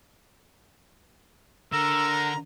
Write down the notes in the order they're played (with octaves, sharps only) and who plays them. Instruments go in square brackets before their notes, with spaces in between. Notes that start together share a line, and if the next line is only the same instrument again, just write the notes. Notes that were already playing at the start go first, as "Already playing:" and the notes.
[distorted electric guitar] D3 [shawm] A#4 [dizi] A#5 [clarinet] E6